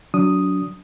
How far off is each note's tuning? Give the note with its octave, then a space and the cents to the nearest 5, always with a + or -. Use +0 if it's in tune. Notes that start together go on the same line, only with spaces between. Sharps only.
F#3 -5 D4 -35 D#6 +0